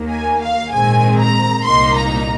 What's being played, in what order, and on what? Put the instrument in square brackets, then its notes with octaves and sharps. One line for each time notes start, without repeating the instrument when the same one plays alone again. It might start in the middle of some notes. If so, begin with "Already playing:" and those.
Already playing: [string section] D#2 D#3 A#3
G#5
F5
A#1 G#2 D#3 G#3 C4 G#5
A#5
C2 A#2 A#3 D#4 C6
A#5